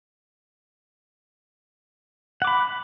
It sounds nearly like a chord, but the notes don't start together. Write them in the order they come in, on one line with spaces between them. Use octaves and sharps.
F#5 D6 B5